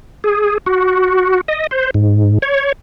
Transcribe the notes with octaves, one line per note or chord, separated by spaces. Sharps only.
G#4
F#4
D#5
C5
G#2
C#5